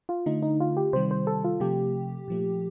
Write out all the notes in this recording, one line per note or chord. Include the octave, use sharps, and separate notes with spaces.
F4
D3 A3 D#4
D#4
F4
G4
C3 D#3 G3 C5
C5
A4
F4
C3 F3 A3 G4
A#2 F3 A3